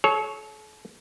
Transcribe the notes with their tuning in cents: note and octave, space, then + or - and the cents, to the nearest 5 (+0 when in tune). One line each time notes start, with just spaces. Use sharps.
A4 -40 C#5 +0